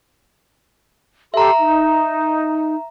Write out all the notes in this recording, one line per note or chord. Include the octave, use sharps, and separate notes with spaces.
G4 A4 E5 A#5 C6
D#4